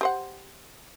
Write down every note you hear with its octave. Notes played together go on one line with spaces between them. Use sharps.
G4 C5 F#5